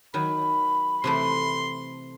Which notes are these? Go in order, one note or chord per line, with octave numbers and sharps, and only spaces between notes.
D#3 F#3 B5
C3 E3 A3 C6